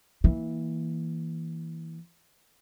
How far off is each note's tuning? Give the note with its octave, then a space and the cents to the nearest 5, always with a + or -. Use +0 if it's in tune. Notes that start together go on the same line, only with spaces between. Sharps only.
E3 -20 A#3 +0